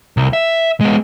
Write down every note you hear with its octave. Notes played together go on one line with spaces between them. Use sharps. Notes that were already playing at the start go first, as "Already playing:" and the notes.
C2
E5
G#3 B3